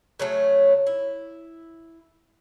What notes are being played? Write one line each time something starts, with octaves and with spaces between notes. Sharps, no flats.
C#3 F#3 A3
E4